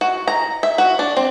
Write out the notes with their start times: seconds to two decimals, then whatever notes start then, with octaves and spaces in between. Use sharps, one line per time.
0.01 F#4
0.28 A#5
0.63 E5
0.78 F#4
0.99 D4
1.17 C4